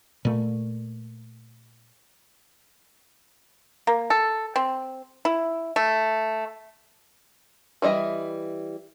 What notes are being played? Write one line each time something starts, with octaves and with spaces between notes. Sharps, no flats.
A#2 A3
A#3
A4
C4
E4
A3
E3 G3 D#5 E5